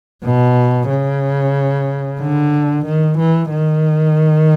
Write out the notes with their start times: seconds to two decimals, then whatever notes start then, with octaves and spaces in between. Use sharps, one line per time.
0.25 B2
0.89 C#3
2.21 D3
2.86 D#3
3.19 E3
3.50 D#3